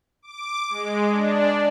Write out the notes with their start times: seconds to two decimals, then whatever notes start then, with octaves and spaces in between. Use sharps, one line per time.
0.22 D6
0.70 G#3
1.10 D4